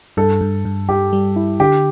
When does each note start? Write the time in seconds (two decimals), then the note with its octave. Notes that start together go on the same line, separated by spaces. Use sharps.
0.17 G2 A4
0.41 G2
0.65 G2
0.89 G2 G4
1.13 G3
1.36 E4
1.60 D3 G4